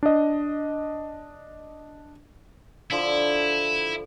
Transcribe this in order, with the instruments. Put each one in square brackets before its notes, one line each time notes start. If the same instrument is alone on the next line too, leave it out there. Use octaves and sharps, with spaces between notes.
[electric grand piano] D4 D#5
[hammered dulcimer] D3 F3 [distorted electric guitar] E4